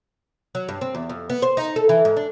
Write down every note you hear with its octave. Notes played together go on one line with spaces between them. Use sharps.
F#3
G2
C4
E2
F2
B3
C5
D#4
A4
E3
G#2
D4